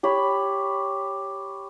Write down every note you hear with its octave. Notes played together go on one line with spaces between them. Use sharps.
G4 C#5 B5